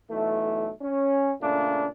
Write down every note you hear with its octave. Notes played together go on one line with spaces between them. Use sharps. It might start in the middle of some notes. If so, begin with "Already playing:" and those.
B1 E3 A3
C#4
A#2 C#3 A3 D4